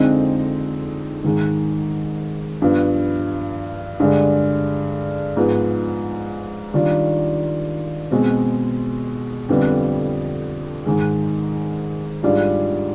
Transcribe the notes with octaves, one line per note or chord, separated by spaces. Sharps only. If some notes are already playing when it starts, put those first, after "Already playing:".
Already playing: F2 D3 G#3 C4 D#4
G#2 D#3 G#3
G2 F3 B3
G2 D3 G#3 D4
G#2 F3 B3 F4
D#3 G3 D4 F4
B2 G#3 C4
F2 D3 G3 B3
G#2 D#3 G#3
G#2 G3 D4 F4